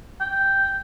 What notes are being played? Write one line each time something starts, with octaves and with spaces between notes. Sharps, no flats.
G5